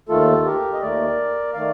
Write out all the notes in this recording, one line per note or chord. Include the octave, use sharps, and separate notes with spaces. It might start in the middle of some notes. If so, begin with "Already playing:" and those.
D#2 D#3 A3 F4 A4
G4 A#4
D#5
D#2 D#3 A3 A#4 D5
D#3 A3 D5 F5